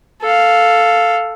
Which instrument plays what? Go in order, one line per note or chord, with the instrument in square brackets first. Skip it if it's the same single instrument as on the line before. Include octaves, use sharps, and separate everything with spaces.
[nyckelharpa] A4 F5